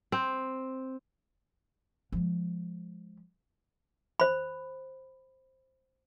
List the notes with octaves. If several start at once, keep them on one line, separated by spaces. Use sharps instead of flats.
C4
F3 G#3
C5 B5